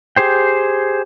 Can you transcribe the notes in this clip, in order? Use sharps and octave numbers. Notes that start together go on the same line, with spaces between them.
G4 G#4 C5 G5